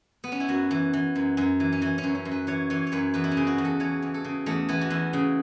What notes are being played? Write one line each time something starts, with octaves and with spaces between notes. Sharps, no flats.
B3
C#4
E4
F#2 F#4
E3
E3
F#2
F#2
E3
C#4
E3 E4
C#4
F#2
C#4
F#2
B4
E3 C#5
E3 C#5
C#5
F#2 B4
E2 B4
E4
C#4
C#3
F#4
E2
A4
E3 C#5
E2
A4
C#3
E2 A3
E3 B3
F#4
E2 E4
C#3